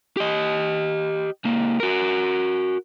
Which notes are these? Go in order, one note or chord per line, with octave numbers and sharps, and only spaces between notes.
G4 D#5
C#2 A#3
F#4 A#4